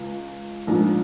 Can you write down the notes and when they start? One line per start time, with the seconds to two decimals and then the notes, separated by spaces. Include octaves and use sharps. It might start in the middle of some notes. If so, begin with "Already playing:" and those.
Already playing: C#2
0.67 A#1 G#2 F3